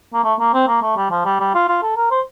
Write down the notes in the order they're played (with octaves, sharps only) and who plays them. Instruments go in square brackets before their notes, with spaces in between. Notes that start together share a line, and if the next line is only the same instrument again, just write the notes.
[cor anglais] A#3
A3
A#3
C4
A#3
A3
G3
F3
G3
G3
F4
F4
A4
A#4
C5